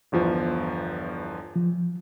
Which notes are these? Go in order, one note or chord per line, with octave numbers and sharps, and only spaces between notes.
G1 E2 F3
F3